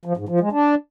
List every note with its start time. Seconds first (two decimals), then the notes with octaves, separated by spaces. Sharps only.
0.05 F3
0.17 G#2
0.29 F3
0.40 G#3
0.52 D4